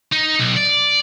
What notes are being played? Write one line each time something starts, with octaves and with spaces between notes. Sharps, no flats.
D#4
B1
D5